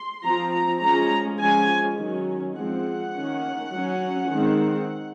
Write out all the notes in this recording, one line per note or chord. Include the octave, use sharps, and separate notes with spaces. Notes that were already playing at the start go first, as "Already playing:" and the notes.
Already playing: C6
F3 C4 A#5
A#5
F3 G#3 C#4 A#5
F3 G#3 C#4 G#5
D#3 F#3 C#4
F3 G#3 C4 F#5
D#3 A#3 C#4
F#3 C#4
D#3 G#3 C4